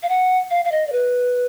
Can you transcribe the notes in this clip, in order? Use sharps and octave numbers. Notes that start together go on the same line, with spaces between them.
F5
F#5
F5
F5
D#5
D5
B4